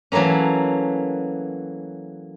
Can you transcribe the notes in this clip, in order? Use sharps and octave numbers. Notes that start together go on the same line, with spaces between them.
E3 F#3 A3 A#3 C#4